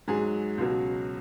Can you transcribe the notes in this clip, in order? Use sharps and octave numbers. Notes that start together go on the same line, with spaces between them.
G#2 F#3 G#4
C#2 B2 F#3